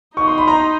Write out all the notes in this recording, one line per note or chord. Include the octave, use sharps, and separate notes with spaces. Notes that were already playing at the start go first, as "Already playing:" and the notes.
D#4 C#6
C6
B5
A#5 C6